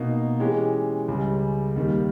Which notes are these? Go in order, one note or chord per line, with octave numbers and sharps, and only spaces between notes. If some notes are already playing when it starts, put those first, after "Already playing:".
Already playing: B2 A#3 D#4
E3 G#3 C#4 G4
C#2 C#3 G3
D#2 D#3 G3